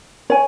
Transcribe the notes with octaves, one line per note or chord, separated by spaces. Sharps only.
C#5 G#5